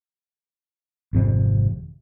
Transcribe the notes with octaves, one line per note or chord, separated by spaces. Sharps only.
G#1 F2 C3